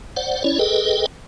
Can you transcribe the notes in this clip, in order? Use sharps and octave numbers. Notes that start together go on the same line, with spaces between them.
C5 D5 F#5
C#4 E4 C#5 D5
G#4 A4 B4 D#5 G5